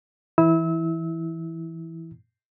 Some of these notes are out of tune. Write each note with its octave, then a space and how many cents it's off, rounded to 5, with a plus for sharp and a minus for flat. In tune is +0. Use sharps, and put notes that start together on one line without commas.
E3 +0 E4 -10 E6 -30